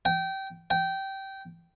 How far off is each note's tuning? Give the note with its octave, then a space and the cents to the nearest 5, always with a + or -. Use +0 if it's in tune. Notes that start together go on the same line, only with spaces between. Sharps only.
G5 -20
G5 -15